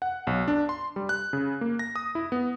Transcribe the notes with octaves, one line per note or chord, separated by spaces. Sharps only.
F#5
B1
D4
C6
G3
F#6
C#3
A#3
A#6
D#6
E4
B3